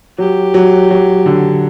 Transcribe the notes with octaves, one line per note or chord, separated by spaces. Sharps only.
F#3 G4
F#3
F#3
D3